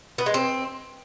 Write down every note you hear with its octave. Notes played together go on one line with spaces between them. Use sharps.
B3
G#3
C4